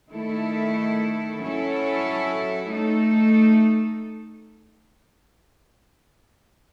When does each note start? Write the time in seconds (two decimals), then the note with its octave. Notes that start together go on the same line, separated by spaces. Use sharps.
0.11 D#3 A3 E4 A4
1.40 F#3 C#4 E4 A4 C#5
2.71 A3 D#4 A4